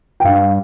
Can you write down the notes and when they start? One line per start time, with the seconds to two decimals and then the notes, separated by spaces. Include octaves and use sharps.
0.20 G5
0.25 G2 F5